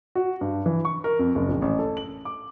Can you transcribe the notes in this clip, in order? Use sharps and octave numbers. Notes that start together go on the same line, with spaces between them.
F#4
G2
E3
C#6
A#4
F2
F#1
A#1
A1
A4
F#7
D6